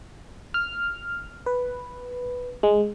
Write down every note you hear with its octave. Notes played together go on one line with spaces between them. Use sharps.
F6
B4
G#3